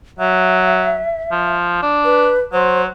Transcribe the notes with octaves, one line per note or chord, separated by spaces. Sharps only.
F#3 E5
F3
D4
B4
F#3 C5